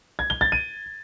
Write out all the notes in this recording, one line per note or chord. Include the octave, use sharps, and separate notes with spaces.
G#6
G7
A6
D#7